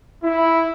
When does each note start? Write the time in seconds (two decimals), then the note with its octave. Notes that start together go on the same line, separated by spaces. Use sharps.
0.24 E4